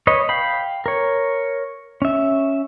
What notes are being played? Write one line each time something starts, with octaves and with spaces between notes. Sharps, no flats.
B4 C#5 D#5
F5 G5 B5
A#4 C#5
C#4 E5